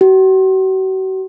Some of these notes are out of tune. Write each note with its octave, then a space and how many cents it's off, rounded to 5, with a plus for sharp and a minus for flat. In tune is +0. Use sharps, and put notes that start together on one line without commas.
F#4 +40